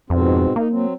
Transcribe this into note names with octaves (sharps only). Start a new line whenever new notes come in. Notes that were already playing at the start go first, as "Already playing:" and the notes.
F2 G#2 B2 C4
A#3 D#4
F#3 C4